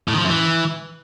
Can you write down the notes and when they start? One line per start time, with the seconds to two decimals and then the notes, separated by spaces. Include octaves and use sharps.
0.08 A2
0.13 D#3
0.19 F3
0.24 F#2
0.30 E3